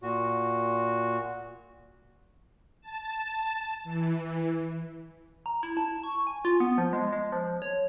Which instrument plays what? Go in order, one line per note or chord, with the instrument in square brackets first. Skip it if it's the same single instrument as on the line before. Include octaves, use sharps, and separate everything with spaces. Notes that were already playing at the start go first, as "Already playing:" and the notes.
[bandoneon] A#2 F#4
[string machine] A5
E3
[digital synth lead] A#5
E4
A5
C#6
G#5
F4
B3
F3
G#3
G#3
F3
C#5